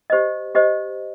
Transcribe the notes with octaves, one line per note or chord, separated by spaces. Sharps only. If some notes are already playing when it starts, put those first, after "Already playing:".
G4 C5 D#5
G4 C5 D#5